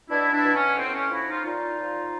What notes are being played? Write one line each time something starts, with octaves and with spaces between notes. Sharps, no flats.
B2 D4 E4
D4 E4
B2
C#4
A2 C4
C#4
F3 E4 F#4
D#4 F4
A#2 D#4 F4
F3